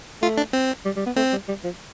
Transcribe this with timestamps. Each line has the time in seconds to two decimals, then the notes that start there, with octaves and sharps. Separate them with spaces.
0.22 A3 F4
0.38 D4
0.53 C4
0.85 G3
0.96 G3
1.06 B3
1.16 A3 C4
1.32 G3
1.48 G3
1.64 F3